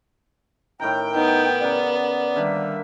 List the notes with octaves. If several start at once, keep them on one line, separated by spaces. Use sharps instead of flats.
A2 D#3 G5 A#5
B3 D#4
C#3 D5 F#5 A#5
D3 D#3 G3 A#3 E5